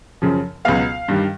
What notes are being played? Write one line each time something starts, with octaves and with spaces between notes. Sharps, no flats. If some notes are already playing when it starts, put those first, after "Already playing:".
F#2 C#3 F3
C#2 B2 F#3 B3 F5
G2 D#3 G3